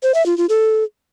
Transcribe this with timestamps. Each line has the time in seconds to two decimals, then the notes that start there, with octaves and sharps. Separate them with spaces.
0.03 C5
0.14 E5
0.26 F4
0.37 F4
0.49 A4